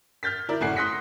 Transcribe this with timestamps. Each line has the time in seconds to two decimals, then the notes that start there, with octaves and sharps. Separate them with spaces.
0.23 F6 G6 A6 B6
0.49 E4 A#4 D5
0.61 F#1 A2 F#5 G#5 F#6 C7
0.76 C6 D#6 F#6 A#6 B6 C#7